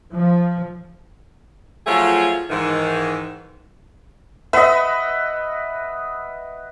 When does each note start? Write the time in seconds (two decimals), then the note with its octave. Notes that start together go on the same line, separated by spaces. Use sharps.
0.13 F3
1.87 F3 F#3 A3 F4 G#4 G#5
2.49 G#2 D#3 E3
4.53 B4 D#5 E5 F#5